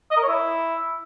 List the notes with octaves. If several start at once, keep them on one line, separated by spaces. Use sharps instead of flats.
D#5
A#4
C#5
E4